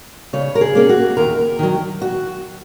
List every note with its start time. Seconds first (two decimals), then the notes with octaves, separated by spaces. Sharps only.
0.33 C#3 C#5
0.55 A#4
0.61 G#4
0.75 A#3 C#4
0.89 F#4
1.17 D#2 A#4
1.59 D#3 F#3
2.02 F#4